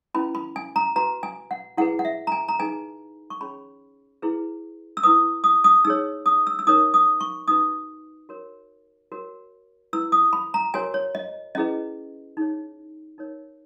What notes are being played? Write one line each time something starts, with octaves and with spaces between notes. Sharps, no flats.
C#4 E4 B4 B5
B5
G#5
A#5
F#4 B4 A#5
G#5
F#5
E4 G#4 B4 F#5
F#5
E5
A#5
G#5
A#5
D#4 G#4 B4 G#5
C#6
C#4 G#4 C#5 B5
E4 G#4 B4
E6
E4 B4 D#6
D#6
D#6
D#4 G#4 C#5 E6
D#6
E6
E6
D#4 A#4 C#5 D#6
D#6
C#6
D#4 F#4 B4 D#6
F#4 A#4 C#5
F#4 A#4 C#5
E4 B4 E6
D#6
B5
A#5
F#4 A#4 C#5 G#5
C#5
D#5
C#4 E4 G#4 B4 D#5
D#4 G#4 C#5
D#4 A#4 C#5